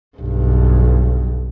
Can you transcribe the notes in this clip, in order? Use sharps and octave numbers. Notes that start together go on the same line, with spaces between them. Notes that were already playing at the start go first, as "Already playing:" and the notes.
B1 G2